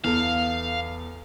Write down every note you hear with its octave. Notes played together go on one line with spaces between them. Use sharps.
E2 A4 F5